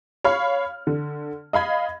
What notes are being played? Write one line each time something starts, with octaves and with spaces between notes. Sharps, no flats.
C#5 F5 B5 F6
D3
D#5 F5 B5 G#6